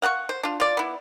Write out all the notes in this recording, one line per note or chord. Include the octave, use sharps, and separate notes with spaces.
F5 F#5 A5 C#6
C5
D4 F4
F4 D5
B3 E4